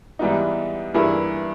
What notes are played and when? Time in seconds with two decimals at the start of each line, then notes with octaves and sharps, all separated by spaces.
0.19 G#2 E3 G3 B3 D#4
0.94 G2 E3 A#3 E4 G#4